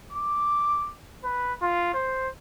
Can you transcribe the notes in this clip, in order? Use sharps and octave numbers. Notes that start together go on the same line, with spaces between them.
D6
B4
F4
C5